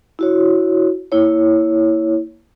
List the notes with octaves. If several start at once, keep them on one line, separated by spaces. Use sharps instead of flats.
E4 F#4 C#5
A#3 E4 C#5